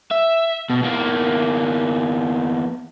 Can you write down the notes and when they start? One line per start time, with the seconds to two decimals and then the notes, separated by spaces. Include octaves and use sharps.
0.11 E5
0.70 B2
0.83 E2 A#3